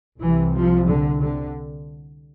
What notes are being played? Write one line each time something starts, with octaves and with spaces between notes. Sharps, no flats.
C2 C3 E3
F3
D3
D3